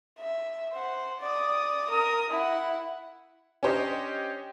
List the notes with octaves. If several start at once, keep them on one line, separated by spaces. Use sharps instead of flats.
E5
C5 F#5
D5 D#6
A#4 D#6
E4 F#5
C#4 D4 G4 C5 C#5 D#5